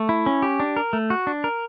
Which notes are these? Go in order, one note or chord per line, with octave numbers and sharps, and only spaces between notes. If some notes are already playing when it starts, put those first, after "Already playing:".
Already playing: A3
E4
C#4
G4
D4
A#4
A3
F#4
D4
A#4